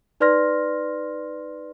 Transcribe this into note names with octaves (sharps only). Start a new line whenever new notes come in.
D#4 B4 D5 C6 F6 A#6